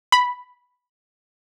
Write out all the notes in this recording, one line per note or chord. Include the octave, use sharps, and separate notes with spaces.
B5